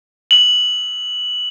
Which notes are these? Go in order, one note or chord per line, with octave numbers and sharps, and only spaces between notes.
F#7